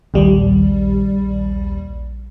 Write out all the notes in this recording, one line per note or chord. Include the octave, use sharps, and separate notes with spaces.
A#1 D#2 G3